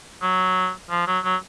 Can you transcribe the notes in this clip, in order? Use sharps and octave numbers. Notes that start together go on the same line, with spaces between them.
F#3
F3
F#3
F#3